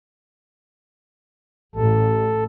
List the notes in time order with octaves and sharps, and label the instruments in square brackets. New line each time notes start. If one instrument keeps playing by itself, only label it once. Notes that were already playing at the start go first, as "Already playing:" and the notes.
[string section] A1 [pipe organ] A4